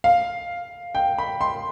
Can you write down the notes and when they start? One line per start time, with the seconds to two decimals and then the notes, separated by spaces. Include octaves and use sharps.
0.04 F5
0.95 G5
1.18 B5
1.41 C6